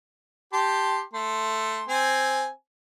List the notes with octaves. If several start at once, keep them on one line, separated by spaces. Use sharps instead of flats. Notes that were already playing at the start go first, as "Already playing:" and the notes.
G4 A5 C6
A3 C6
C4 G#5